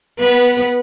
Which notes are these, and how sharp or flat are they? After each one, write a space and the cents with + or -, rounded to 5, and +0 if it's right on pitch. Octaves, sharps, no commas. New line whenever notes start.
B3 +0 B4 -20